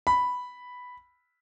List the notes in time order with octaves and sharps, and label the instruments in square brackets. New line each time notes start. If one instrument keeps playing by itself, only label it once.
[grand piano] B5